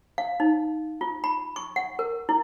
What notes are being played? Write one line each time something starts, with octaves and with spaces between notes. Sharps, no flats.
F5
D#4
F4
B5
C#6
F#5
A#4
E4